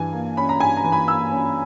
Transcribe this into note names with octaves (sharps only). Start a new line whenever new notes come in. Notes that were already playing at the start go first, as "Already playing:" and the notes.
Already playing: G2 E3 G#5
A#3
C#4 B5
A#5
G2 G#5
A#5
E3
B5
A#3 E6
C#4